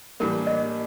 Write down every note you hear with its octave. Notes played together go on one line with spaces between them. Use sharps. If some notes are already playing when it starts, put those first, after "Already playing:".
A2 E3 G3 A#3 D4 A#4
D#5